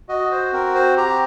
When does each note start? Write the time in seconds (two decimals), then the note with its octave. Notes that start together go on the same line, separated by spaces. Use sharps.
0.09 F#4 D#5
0.31 C5
0.53 C4 A#4
0.75 C5
0.97 G4 A#5